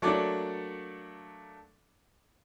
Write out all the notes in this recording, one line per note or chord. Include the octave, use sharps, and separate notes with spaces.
F#3 A3 A#3 D4 A4 D5